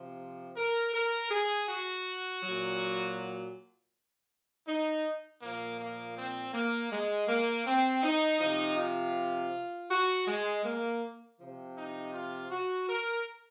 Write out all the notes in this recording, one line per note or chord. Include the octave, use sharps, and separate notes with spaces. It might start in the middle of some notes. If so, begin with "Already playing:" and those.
Already playing: C3 F3
A#4
A#4
G#4
F#4
A#2 F#3
D#4
A#2 F3 A#3
A#3
C4
A#3
G#3
A#3
C4
D#4
C3 F3 D#4
F4
F#4
G#3
A#3
C3 F3
D#4
F4
F#4
A#4